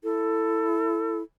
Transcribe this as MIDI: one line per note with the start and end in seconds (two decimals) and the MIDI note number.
0.04 1.23 64
0.04 1.18 69